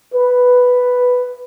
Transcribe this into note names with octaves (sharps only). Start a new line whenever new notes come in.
B4